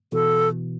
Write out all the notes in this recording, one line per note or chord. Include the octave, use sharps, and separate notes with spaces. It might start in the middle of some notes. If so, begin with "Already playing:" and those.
B2 E3 A4